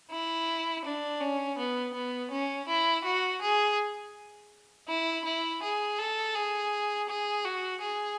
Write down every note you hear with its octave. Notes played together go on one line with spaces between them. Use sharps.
E4
D4
C#4
B3
B3
C#4
E4
F#4
G#4
E4
E4
G#4
A4
G#4
G#4
F#4
G#4